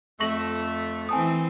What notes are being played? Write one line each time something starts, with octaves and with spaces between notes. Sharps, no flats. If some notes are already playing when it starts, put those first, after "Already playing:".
F2 A3 C#6 A#6 F#7
E3 C4 G#5 A5 D#6